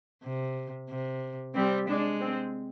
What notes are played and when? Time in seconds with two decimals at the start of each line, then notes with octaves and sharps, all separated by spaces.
0.23 C3
0.89 C3
1.55 G3 C4
1.88 G#3 D4
2.21 C4